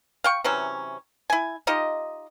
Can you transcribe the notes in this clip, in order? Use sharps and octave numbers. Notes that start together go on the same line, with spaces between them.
F5 G5 C#6
C3 E3 F#3 C#4
E4 G#5
D#4 F4 G4 D#5